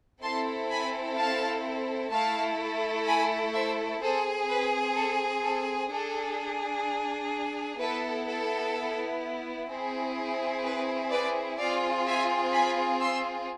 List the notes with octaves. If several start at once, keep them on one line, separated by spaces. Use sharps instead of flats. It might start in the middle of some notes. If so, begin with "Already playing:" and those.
C4 E4 A4 A5 C6
G#5 B5
F5 A5
A3 E4 A4 F5 A5
G#5 B5
C5 E5
C4 G#4 A4 C5
B4
A4
A4
D4 G#4 A4
B3 E4 A4 B4
A4
C4 E4 G#4
B4
B4 D5
C4 F4 G#4 D5 F5
E5 G#5
G#5 B5
C6 E6